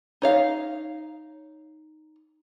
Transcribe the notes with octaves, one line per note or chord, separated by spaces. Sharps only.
D#4 C#5 F5